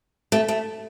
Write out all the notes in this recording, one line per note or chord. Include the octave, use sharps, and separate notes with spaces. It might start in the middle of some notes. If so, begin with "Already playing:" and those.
A3
A3